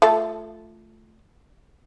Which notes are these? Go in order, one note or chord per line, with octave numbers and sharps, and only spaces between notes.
A3 F4 A4